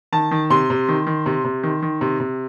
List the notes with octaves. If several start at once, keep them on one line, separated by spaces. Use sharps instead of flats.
D#3 A5
D#3
C3 C6
C3
D#3
D#3
C3
C3
D#3
D#3
C3
C3